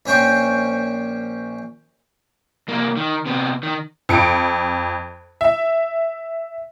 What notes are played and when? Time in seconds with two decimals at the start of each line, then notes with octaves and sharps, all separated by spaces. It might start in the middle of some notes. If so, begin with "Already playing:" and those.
0.06 A#1 C#4 C5 G5 C#6
2.68 C2 A#3
2.97 D#3
3.26 C3 B3
3.63 D#3
4.09 F2 C#7 D7
5.41 E5